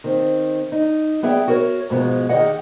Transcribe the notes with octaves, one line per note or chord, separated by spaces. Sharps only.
D#3 C4
D#4
G3 B3 G#4 E5 G5
F#4 A#4 C#5
G#2 B2 E3 F3 G#3
D#3 G4 G#4 C#5 D#5 F#5